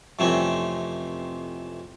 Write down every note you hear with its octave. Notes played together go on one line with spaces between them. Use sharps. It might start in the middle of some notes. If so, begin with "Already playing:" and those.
F2 C3 E3 A3 C4 C#4